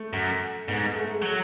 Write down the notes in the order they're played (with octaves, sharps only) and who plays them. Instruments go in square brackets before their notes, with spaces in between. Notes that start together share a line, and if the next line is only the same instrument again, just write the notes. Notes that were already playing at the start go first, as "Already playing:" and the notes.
Already playing: [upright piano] A3
[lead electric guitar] F#2
[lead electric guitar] G#2 [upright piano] B3
[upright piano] A3
G#3
[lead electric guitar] F#3 [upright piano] A3